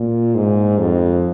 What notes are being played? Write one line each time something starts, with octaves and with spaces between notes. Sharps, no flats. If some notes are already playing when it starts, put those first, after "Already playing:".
Already playing: A#2
G#2
F2